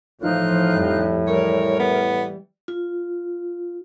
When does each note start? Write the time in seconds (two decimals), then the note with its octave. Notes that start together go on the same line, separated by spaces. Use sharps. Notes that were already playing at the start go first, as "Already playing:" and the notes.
0.21 A2 E3 F3 D#4 F4 F#6
0.70 F2 G3
1.27 E3 G3 A#4 C#5
1.79 B3
2.68 F4